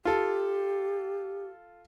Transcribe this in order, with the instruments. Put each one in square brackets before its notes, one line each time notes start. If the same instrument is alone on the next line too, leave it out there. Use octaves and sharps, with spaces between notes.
[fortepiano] F4 A4 [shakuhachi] G4